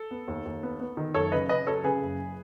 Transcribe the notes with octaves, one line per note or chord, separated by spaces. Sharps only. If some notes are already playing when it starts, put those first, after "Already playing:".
Already playing: A4
B3
D#2
D#2
B3
B3
D#3
F#1 A4 C#5
C#3 B4 D#5
C#3 B4 D#5
F#3 A4 C#5
C#3 G#4 B4
F#1